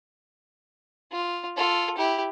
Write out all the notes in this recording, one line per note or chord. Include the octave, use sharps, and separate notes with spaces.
F4
F4 A4
E4 G4